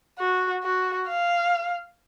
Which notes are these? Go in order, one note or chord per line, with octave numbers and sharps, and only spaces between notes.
F#4
F#4
F5